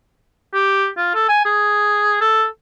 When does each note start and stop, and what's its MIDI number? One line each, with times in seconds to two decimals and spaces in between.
0.54 0.87 67
0.97 1.11 65
1.14 1.24 69
1.28 1.40 80
1.45 2.18 68
2.21 2.45 69